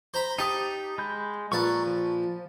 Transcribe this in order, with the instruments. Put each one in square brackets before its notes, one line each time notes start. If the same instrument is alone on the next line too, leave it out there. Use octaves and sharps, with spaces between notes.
[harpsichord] C5 A#5 B5
[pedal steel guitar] D#4 G4 D#6 [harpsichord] G5 A5
[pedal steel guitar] G#3 B5 G6
[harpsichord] A#1 B4 A5 [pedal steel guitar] A#5 C#6
[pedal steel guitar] F3